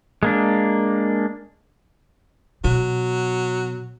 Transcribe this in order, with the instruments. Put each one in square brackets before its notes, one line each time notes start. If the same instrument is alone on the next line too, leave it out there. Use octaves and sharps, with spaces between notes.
[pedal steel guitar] G#3 A#3 D4
[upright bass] B2 [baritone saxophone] F#3